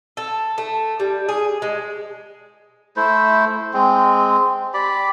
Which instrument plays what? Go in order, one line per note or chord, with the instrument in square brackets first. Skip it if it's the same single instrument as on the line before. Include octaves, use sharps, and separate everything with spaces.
[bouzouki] A4
A3
G3
G#4
G#3
[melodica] A3 E4 C5
G#3 C4
G4 D5 B5